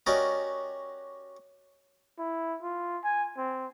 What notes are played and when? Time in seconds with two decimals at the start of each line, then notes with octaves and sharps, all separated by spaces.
0.06 C#4 F#4 G4 A#4 D5 D#5
2.18 E4
2.62 F4
3.04 G#5
3.38 C4